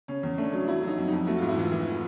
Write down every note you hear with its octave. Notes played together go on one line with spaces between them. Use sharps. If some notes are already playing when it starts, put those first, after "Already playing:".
C#3 C#4
E2
A3 D4
F#3
F#3 E4
F#3 D#4
F2
F2 D#4
A3 F#4
G#2 F4
E4
E3 F4
E3